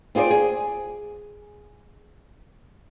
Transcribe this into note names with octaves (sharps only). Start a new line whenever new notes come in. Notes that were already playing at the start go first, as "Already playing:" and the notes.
C4 F4 G#4 C5 D5
G#4